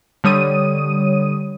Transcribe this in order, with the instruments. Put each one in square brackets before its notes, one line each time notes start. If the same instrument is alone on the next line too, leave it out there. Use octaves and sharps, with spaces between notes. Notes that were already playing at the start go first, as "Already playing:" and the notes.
[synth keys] D3 G3 C#5 D#6 D#7